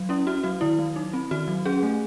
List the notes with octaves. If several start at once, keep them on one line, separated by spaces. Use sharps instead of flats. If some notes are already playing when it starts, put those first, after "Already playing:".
Already playing: F#3
C#4 E4
C#4 F#4
F#3 F#4
D#3 E4
F#3
D#4
C4
D#3 F#4
F#3
C#4 G#4
A3